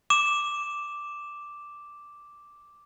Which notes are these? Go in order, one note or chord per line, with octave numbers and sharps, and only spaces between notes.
D6 E7